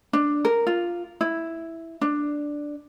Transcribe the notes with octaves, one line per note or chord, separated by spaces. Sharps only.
D4
A#4
F4
E4
D4